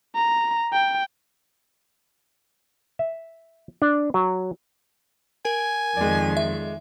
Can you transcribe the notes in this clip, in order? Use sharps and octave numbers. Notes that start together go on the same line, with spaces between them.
A#5
G5
E5
D4
F#3
A#4 G#5
F2 D#3 G#3 D5
E5